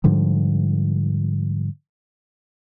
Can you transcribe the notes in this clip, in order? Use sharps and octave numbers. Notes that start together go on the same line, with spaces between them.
G#2 D3 F3 G3